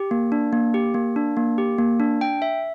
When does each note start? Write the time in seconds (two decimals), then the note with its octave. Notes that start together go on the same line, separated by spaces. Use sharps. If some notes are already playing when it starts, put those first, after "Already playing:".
Already playing: G4
0.11 A#3
0.32 D4
0.53 A#3
0.74 G4
0.94 A#3
1.16 D4
1.37 A#3
1.58 G4
1.78 A#3
2.00 D4
2.21 G5
2.42 E5